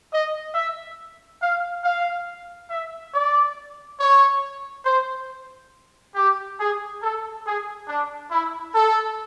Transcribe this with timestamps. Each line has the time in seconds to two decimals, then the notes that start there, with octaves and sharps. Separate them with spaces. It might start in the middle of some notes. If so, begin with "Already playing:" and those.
0.12 D#5
0.55 E5
1.42 F5
1.84 F5
2.71 E5
3.14 D5
4.00 C#5
4.86 C5
6.16 G4
6.59 G#4
7.02 A4
7.45 G#4
7.88 D4
8.31 E4
8.75 A4